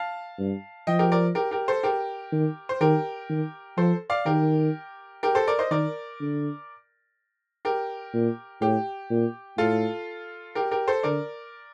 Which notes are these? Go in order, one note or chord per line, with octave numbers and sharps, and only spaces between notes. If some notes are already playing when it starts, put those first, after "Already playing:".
Already playing: F5 A5
G2
F3 D#5 G5
G4 A#4
A#4 D5
G4 A#4
G4 A#4
A4 C5
G4 A#4
D#3
C5
D#3 G4 A#4
D#3
F3 A4 C5
D5 F5
D#3 G4 A#4
G4 A#4
A4 C5
A#4 D5
C5 D#5
D#3 A#4 D5
D3
G4 A#4
A#2
A2 G4
A#2
A2 F4 A4
G4 A#4
G4 A#4
A4 C5
D3 A#4 D5